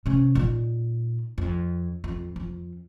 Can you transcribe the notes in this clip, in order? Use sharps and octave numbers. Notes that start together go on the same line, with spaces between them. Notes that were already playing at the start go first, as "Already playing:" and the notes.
C3 C#4
A#2 D#4
F2
F2
F2